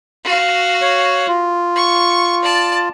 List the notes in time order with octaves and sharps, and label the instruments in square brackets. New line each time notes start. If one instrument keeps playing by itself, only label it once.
[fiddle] F#4 F5
[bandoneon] C#5
F4
[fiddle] C#6
D5 A5